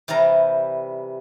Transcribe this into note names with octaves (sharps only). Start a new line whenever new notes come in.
C3 E3 G3 A#4 A#5